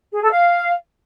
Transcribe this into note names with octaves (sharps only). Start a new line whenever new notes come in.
G#4
A4
F5